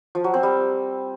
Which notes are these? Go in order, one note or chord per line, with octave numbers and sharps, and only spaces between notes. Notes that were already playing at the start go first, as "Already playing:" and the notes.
F3
F#3
C4
G3